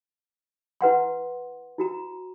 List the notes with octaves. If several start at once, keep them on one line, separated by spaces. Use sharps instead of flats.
E4 B4 F#5 C6
E4 F#4 A#5